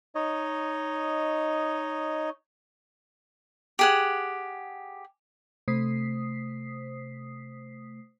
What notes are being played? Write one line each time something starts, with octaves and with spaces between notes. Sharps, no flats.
D#4 C#5 D#5
G4 G#4 F#5
C3 A3 C5 D#6 B6 C7